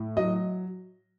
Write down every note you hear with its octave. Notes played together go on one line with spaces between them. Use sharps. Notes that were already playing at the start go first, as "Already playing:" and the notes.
Already playing: A2
F#3 D#5